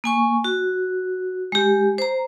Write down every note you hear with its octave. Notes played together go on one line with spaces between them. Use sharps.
A#3 G#5 C#6
F#4
G#3 G4
C5 A#5